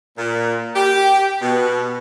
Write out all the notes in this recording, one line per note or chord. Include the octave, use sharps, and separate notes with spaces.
A#2
G4
B2